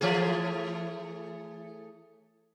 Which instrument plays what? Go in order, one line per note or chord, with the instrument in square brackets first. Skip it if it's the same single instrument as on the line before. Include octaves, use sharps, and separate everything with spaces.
[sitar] E3 A3 G#4